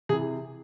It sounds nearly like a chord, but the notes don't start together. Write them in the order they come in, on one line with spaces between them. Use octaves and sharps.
C3 G#4 E3